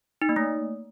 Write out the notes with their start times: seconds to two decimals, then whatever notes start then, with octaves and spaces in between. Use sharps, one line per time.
0.22 D#4
0.29 A#3
0.36 A3